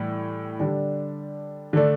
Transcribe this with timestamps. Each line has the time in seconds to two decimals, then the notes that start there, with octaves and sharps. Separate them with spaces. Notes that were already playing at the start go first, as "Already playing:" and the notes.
Already playing: A2 E3 G3
0.59 D3 G3 D4
1.73 D3 A3 D4